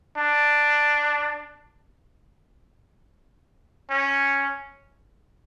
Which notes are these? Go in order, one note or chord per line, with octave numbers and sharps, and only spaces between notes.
D4
C#4